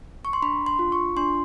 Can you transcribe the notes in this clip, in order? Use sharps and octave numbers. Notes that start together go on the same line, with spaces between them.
C#6
C6
D4 B5
C6
F4
C#6
D4 C6